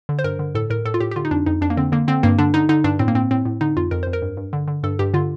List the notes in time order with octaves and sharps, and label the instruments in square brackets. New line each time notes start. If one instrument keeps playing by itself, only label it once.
[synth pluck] D3
C5
G2 A#4
D3
A2 A4
A2 A#4
A2 A4
F4
A2 G4
G4
D3 F4
D#4
F2 D4
F2 D#4
F2 D4
A#3
D3 C4
D3 A#3
D3 C4
G2 A#3
D3 D4
D3 D#4
D3 D#4
G2 D4
A2 C4
A#3
A2 C4
A2 C4
A2
D3 D#4
F2 F4
F2 A#4
F2 C5
A#4
G2
G2
D3
D3
G2 A4
G2 G4
D3 F4